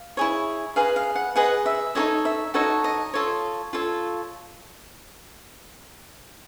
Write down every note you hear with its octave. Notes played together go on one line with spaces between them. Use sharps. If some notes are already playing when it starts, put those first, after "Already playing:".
Already playing: F5
E4 G#4 C#5
G#4 B4 D#5 F5
F5
F#5
G#4 B4 D#5 F#5
E5
D#4 F#4 A4 C#5 D#5
E5
D#4 F#4 A4 C#5 D#5
D#5
F4 A4 C#5
F4 A4 C#5